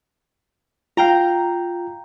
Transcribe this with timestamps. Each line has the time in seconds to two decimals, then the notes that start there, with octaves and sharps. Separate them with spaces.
0.97 F4 F5 G5 A#5